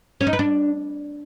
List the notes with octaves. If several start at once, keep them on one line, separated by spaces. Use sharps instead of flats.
C#4
D#4
B4
D4